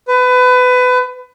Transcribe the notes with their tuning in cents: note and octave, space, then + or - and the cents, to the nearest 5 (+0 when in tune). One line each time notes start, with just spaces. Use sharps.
B4 +25